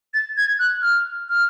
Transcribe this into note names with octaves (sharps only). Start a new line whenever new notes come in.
A6
G#6
F#6
F6
F6